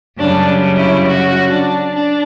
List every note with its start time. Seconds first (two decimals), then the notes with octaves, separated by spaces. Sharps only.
0.19 F#2 C#3 G3 D4
0.77 E4
1.07 F#4
1.50 D4
1.94 D4